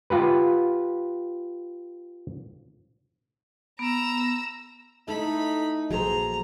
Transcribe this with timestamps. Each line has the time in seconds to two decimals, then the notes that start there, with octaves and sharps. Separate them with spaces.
0.10 F4 G4 B4
3.79 B3 A#5 E6
5.08 A3 D#4 E4 A4 B5
5.91 A#1 F#3 G#4 A4 C5 A#5